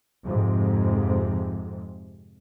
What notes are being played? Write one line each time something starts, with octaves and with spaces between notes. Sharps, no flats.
F2 G#2 C3